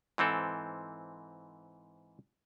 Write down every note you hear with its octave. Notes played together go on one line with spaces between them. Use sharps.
G#2 E3 C4 A4